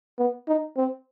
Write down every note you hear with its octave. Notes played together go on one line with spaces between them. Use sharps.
B3
D#4
C4